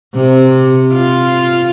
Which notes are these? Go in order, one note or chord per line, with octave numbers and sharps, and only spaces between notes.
C3
F4